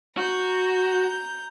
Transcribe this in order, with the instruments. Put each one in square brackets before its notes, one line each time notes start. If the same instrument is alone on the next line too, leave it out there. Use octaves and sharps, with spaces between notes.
[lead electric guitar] F#4 [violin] A#5 G6